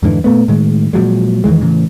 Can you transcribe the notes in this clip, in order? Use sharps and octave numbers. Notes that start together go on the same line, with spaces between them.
F2 G#2 D3 E3
A#2 A3 B3
A2 D#3 G#3
A#2 F3 F#3 G#3
F2 D#3 E3 G#3
A2 C#3 E3